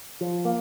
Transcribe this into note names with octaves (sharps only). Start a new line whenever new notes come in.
F3
A#3